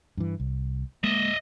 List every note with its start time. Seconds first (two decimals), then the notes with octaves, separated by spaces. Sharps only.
0.17 G2 E3
0.40 C2
1.04 G#3 A#3 D#5 E5